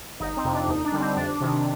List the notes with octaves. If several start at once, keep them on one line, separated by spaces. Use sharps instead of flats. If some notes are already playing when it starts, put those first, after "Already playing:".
G1 D#4
C4
F2 C3
D4
D#2 D#4
D4
D3 G3
C4
F2 D4
C3 D#3